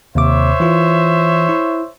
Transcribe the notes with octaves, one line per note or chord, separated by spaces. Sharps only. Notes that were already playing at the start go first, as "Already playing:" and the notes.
D#2 C3 C5 C#5 E5 D6
E3 F4
E4